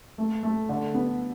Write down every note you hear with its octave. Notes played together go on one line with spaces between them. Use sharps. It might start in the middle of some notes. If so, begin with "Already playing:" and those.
A3
A3
D3
B3